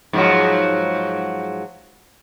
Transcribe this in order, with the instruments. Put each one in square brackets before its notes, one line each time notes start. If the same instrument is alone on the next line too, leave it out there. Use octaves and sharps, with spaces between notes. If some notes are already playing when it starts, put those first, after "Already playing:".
[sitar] G#2 F3 F#3